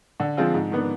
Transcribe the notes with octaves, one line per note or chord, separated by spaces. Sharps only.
D3
F3 G#3 C4 F4
G#2
D#3 B3 D4